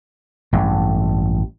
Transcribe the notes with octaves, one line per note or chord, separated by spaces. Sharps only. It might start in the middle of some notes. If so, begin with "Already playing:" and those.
A1 G2